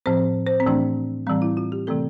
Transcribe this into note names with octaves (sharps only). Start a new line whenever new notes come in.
A2 F3 C4 C5
C5
C4
A2 E3 A3 D4
A2 E3 G3 C4
E4
F4
G4
C3 E3 A3 C4 A4